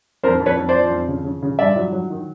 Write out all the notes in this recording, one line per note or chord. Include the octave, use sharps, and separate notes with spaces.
F2 A#4 C5
F2
B4 C#5
F2
C5 D5
F3
F2
C#3
C#3
C#3
G2 D5 E5
F#3
F#3
D#3